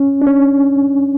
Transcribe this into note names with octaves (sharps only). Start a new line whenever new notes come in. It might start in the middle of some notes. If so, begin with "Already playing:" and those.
Already playing: C#4
D4
C#4